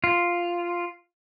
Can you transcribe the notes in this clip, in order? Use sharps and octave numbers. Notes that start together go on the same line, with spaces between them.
F4